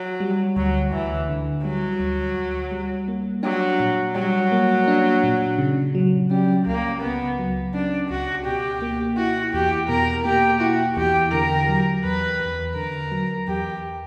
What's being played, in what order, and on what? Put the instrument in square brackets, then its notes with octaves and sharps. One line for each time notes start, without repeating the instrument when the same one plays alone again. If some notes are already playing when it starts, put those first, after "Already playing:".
Already playing: [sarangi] F#3
[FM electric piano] G3
[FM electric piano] D2 [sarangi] F#3
[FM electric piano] D2 [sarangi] E3
[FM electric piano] D3
[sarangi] F#3 [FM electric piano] G3
[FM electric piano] D2
D2
G3
A#3
[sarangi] F#3 [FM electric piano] D4
[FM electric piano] A#2
[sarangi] F#3 [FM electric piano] G3
[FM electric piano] A#3
D4
A#2
C#3
F#3
[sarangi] G3 [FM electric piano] C#4
[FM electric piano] C#2 [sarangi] A#3
[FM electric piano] C#3 [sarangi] B3
[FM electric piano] F#3
[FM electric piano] C#4 [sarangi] D4
[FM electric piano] C#2 [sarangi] F#4
[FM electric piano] B2 [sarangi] G4
[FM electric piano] A#3
[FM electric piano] E4 [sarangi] F#4
[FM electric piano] E2 [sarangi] G4
[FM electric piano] B2 [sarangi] A#4
[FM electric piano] A#3 [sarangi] G4
[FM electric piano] E4 [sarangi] F#4
[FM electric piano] E2 [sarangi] G4
[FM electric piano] D3 [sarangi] A#4
[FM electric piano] F#3
[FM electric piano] E2 [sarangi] B4
[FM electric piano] E2
[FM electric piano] D3 [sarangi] A#4
[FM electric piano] F#3
[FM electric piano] E2 [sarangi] G4